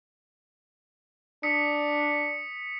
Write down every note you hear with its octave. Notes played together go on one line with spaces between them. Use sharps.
D4 D#6 B6 C#7